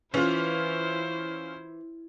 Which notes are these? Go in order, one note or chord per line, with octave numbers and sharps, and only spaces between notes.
E3 C#4 E4 F4 C5